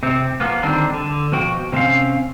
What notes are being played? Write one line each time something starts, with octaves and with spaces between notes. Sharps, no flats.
C3 C4
F3 A#3 B3
D3 D#3 G3 C4 D4
D3
B2 F3 F#4 G5
C3 G#3 C4 C#4 F5